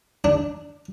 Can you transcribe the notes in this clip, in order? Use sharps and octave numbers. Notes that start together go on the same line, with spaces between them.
D4